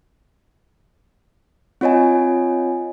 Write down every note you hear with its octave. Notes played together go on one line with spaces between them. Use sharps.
C4 F4 C#5 D#5 G#5